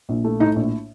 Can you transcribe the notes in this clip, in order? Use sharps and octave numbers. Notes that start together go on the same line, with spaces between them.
A#1
A3
A2 D#4
A#1